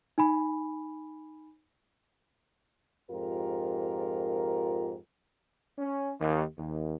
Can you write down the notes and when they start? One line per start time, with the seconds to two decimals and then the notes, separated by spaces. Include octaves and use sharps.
0.18 D#4 G#5 B5
3.10 F2 G#2 F4 G4 A#4
5.78 C#4
6.19 D#2
6.57 D#2